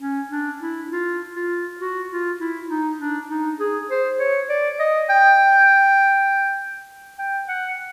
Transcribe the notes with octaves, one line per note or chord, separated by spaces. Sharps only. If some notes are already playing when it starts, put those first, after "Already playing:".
C#4
D4
E4
F4
F4
F#4
F4
E4
D#4
D4
D#4
G#4
C5
C#5
D5
D#5
G5
G5
F#5